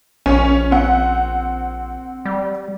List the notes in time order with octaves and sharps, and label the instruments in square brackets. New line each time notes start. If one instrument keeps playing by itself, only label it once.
[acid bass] A#1 [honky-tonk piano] C#4
[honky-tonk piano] C4 F#5
[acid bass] G3